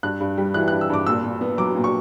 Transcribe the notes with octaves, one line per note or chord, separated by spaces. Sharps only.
G2 F#6
G2
G3
E3 F#6
F#6
G2
E6
G2 D6
A#2 E6
A#2
B3
F#3 D6
A#2
C#6